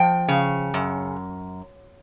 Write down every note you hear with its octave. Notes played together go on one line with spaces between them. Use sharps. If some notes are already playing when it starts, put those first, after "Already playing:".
Already playing: F3 G5
C#3
F#2